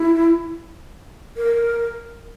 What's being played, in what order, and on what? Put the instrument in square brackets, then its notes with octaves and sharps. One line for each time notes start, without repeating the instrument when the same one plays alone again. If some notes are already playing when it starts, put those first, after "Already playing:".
Already playing: [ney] E4
A#4